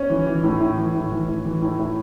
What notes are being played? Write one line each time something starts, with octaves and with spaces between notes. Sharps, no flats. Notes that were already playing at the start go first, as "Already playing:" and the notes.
Already playing: C#4 C#5
E3
E3
A2
A2
E3
A2
E3
A2
E3
A2
A2